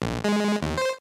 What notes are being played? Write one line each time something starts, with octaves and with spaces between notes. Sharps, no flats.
A#1
G#3
D#2
C5